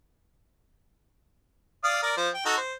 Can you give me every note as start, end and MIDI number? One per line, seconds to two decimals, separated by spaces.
1.84 2.02 74
1.84 2.02 77
1.84 2.02 87
2.03 2.16 70
2.03 2.16 74
2.17 2.29 53
2.17 2.29 72
2.34 2.41 79
2.45 2.56 63
2.45 2.56 66
2.45 2.56 69
2.57 2.74 72